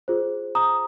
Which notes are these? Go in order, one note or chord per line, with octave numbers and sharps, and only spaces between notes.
F4 G#4 C5
A#5 D#6